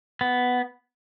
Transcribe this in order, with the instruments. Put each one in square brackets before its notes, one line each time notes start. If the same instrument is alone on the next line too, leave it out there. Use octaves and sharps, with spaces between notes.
[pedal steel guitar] B3